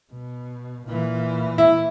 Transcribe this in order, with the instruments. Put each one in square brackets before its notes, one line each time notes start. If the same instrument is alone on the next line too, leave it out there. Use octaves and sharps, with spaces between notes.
[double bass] B2
A#2 E3
[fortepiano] E4